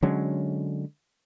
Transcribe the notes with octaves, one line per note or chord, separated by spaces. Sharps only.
D3 F#3 G#3 C#4